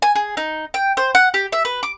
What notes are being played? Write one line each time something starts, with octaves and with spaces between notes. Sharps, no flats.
G#5
G#4
D#4
G5
C5
F#5
G4
E5
B4
D6